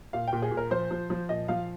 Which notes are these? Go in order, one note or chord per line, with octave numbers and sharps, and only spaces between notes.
A#2 F5
G5
A#2
G#4
A#2
A#4
F3 C5
F3
F3
A#2 D#5
F3 F5